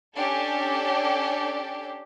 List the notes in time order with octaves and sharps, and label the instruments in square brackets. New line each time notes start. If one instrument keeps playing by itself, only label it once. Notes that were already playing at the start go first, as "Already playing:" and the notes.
[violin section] C#4 D4 G4 A4